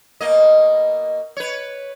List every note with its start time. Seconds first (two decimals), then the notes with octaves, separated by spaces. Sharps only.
0.21 B2 A#3 D#5
1.37 B4 C#5